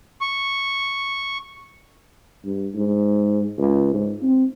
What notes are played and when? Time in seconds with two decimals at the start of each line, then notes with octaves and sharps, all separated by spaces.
0.21 C#6
2.44 G2
2.75 G#2
3.58 C#2
3.94 G#2
4.22 C4